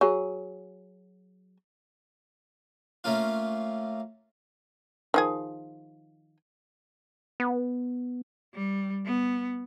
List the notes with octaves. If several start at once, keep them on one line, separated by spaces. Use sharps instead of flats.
F#3 G#4
A3 A#3 C#4 F4
D#3 F3 G#4
B3
G3
B3